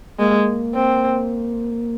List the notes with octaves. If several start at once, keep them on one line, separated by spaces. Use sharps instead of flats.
G#3 A#3
C4